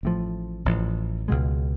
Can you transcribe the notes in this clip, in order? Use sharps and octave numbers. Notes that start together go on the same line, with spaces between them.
A1 A2 F3
A1 A2 F3
C#2 B2 G#3